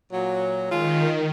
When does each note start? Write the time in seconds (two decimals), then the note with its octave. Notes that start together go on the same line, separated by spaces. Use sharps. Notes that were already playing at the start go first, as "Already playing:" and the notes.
0.11 A#2 F#3
0.69 D#3 G#3 F4